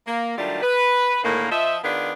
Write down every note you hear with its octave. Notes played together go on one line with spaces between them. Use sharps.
A#3
D#3 F#3 G3 A3 D4 F4
B4
A2 D3 D#3 G#3 A#3
F3 D#5 E5
D#3 B3 D4 F4 G#4 B4